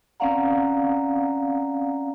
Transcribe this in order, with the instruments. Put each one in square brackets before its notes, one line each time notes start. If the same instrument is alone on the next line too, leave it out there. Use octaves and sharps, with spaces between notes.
[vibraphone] C4 C#4 D5 F5 F#5 A#5